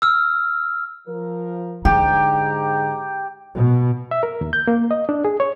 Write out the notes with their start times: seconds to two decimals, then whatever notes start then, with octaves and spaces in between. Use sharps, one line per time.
0.02 E6 F6
1.07 F3 A#4
1.85 G#2 D3 G4 A#5
3.57 B2
4.11 E5
4.23 A#4
4.41 D#2
4.53 G6
4.67 A#3
4.91 D#5
5.09 D4
5.25 G#4
5.40 C#5